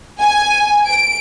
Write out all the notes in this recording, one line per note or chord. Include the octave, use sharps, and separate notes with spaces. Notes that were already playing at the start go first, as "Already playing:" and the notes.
G#5
D7